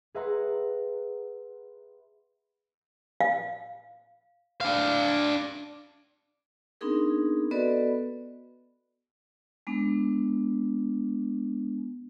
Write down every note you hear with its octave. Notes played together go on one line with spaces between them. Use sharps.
G#4 B4 E5 F#5 A#5 C6
F5
D4 F5
B3 C4 D4 D#4 G#4 A#4
B3 F#4 A4 B4 D5 D#5
G#3 B3 D4